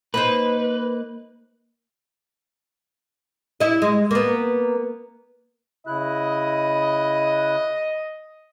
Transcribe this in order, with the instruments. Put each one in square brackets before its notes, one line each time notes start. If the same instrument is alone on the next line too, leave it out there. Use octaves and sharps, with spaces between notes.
[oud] A#3 D#4 C5 [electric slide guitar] B4
[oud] E4 D#5
G#3
A#3 B3
[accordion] C#3 E4 F#6 [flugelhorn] D#5